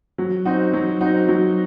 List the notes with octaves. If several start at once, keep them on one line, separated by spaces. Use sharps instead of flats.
F#3
C4 D#4 F#4
F#3
C4 D#4 F#4
F#3